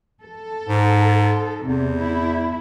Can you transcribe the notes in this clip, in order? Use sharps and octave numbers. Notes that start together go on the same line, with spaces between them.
A4
G#2
E2 C3
E4